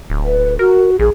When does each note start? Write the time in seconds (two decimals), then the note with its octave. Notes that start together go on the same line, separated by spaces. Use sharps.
0.10 D1
0.24 B4
0.59 F#4 A#4
0.99 A#1 G#4